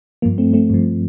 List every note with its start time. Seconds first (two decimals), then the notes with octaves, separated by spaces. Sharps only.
0.22 G2 F3 A#3
0.38 A3 C4
0.53 A3 C4
0.70 G2 F3